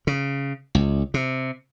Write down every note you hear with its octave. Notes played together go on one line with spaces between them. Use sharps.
C#3
C#2
C3